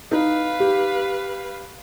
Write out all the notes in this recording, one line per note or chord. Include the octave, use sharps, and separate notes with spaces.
D#4 B4 F5
G4